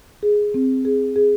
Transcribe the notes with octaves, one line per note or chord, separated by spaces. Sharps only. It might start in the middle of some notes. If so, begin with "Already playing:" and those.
G#4
C4
G#4
G#4